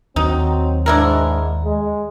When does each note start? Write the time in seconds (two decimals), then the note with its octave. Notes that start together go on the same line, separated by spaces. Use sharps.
0.16 D#2 F#3 C4 D#4
0.86 G#2 D4 E4 A#4
1.65 G#3